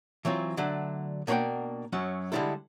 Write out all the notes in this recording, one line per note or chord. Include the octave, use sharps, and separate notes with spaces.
E3 F#3 C4 F4
D3 F#3 A3 D4
B2 A#3 D4 C#5 F#5 G5
F#2 F#3 C#4
D3 G3 G#3 D4 E4 A4